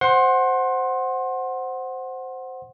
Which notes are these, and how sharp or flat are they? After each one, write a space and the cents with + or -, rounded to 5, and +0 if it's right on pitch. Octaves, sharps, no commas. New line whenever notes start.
C5 +0 F#5 +0 C6 +25